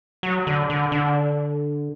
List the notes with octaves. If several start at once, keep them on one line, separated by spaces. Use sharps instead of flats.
F#3
D3
D3
D3